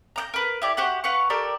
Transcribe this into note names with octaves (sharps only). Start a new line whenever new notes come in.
A#5 D6 G6
A#4 B4
E4 G4 D5
F#4 G4 C5 F#5
F#4 B4 F5 C#6
G4 A4 A#4 D5